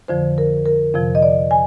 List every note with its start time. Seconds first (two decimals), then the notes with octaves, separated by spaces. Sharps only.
0.08 F2 D3 F3 C5
0.38 A#4
0.66 A#4
0.94 F2 C3 F3
1.15 D#5
1.22 D5
1.51 G#5